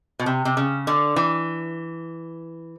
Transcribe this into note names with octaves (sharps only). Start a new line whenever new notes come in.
B2
C3
C3
C#3
D3
E3